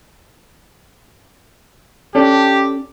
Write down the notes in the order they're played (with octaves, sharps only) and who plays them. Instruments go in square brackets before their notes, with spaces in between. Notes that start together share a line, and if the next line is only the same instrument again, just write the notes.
[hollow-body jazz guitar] C#4 D4 A4 [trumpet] G4